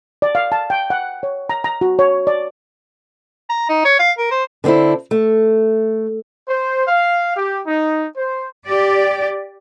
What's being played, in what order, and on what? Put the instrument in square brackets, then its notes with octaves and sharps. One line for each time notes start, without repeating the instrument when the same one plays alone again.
[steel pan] D5
F5
A5
G5
F#5
C#5
A#5
A#5
F#4
C#5
D5
[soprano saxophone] A#5
D#4
C#5
F5
A#4
C5
[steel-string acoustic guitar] D3 B3 C4 D4 E4
A3
[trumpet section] C5
F5
G4
D#4
C5
[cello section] G4 D5